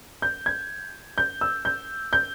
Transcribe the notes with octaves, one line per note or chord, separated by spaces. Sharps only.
G6
G#6
G6
E6
G6
G6